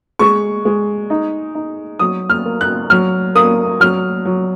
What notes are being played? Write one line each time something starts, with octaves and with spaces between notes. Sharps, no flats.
G#3 C#6
G#3
D#4
D#4
F#3 D#6
F6
A#3
F#6
F#3 F6
A#3 D#6
F#3 F6
F#3